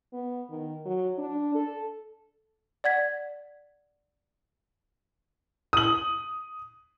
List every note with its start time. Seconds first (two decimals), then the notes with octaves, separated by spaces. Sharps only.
0.13 B3
0.50 D#3
0.85 F#3
1.18 D4
1.55 A4
2.84 D5 F#5 G#6 B6
5.73 D#6 F#7